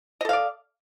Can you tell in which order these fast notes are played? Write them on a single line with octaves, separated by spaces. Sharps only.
D#5 A4 F5 D5